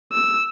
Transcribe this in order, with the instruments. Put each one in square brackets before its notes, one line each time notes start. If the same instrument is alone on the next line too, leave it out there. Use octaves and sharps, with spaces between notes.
[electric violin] E6